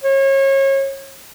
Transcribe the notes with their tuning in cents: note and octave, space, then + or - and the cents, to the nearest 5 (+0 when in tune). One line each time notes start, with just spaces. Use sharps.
C#5 -30